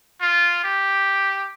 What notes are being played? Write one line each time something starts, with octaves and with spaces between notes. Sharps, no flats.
F4
G4